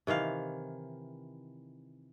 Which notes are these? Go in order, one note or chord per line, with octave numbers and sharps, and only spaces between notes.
C3 D#3 E3 F5